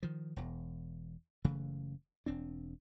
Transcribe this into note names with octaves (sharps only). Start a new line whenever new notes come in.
D#3 F3
E1 E2
F#1 C#3 E3 A3
E1 C4 D4